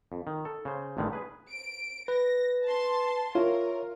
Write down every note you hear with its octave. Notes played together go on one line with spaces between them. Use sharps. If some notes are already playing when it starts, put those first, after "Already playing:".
F2
D#3
A4
C#3 C5
A1 A2 D3 D#3 G3 G#3
G#4 B4
D7
B4 A#6
A5 C6
F4 A#4 C#5 E5